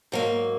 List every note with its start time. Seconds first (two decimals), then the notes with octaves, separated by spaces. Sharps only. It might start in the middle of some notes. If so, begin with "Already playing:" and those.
0.12 G#2 F#3 A#3